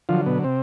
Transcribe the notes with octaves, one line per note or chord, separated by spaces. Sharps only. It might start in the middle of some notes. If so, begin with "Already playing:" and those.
D3 F3 F#3 F4
B2 B3
C3 C4